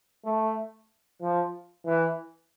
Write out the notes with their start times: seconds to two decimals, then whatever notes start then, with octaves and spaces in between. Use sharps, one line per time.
0.24 A3
1.22 F3
1.86 E3